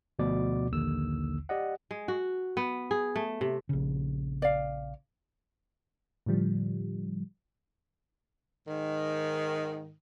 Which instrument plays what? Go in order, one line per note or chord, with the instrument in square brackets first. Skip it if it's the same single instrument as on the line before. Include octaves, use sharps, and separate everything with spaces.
[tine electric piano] D2 B2 F3 D5 D6
A#1 D#2 D3 E6
G4 D5 D#5 F#5
[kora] G#3
F#4
B3
G#4
A3
C3
[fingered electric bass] A#1 C#3
[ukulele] D5 F5
[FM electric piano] A2 D3 F3 G3
[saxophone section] G#2 D#3